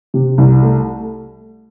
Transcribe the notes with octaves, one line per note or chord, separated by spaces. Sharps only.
C3
C2
A3